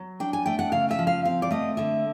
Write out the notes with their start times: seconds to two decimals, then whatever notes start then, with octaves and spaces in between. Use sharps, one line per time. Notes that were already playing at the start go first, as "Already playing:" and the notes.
Already playing: F#3
0.20 D4 G5
0.33 G#5
0.46 A3 G5
0.59 F#5
0.72 C#3 F5
0.91 E5
0.99 F3
1.07 F5
1.25 C4 F5
1.42 D5
1.51 A3 D#5
1.77 D3 E5